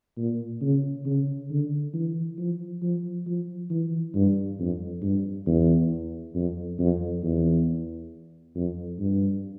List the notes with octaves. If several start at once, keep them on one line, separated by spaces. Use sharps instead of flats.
A#2
C#3
C#3
D3
E3
F3
F3
F3
E3
G2
F2
G2
E2
F2
F2
E2
F2
G2